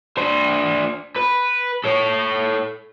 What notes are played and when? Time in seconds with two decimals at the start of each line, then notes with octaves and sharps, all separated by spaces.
0.18 D4 C5
1.16 B4
1.84 A4 C#5